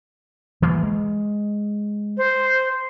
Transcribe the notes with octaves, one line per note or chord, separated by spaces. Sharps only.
E3 F#3 A#3
G#3
C5